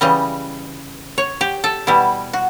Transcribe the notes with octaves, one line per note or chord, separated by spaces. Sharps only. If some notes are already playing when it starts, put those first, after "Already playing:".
C#3 E3 G3 D#5
C#5
G4
A4
B2 G3 E4
F#4